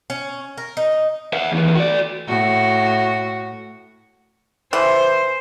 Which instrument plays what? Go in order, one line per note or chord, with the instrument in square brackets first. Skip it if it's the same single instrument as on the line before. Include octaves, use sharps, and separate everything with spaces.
[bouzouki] C#4
A#4
D#4
[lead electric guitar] E5 F#5
D#2 E3
F#4 D5
[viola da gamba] A2 F#4
[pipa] E3 [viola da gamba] C5